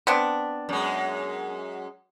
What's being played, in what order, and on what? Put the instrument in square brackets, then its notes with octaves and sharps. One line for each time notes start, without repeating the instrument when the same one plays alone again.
[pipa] B3 C4 D4
[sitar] F#2 G#3